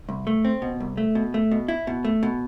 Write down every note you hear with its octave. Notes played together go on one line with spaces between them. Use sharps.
C2
A3
C4
B2
C2
A3
B2
A3
B2
E4
B2
A3
B2